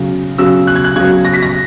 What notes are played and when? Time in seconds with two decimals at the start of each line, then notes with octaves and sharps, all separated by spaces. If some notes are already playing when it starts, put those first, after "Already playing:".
Already playing: C#3 F#3
0.38 C#3 F#3 E6
0.67 F#6
0.75 G#6
0.84 F#6
0.96 C#3 F#3 G#6
1.25 A#6
1.34 B6
1.43 A#6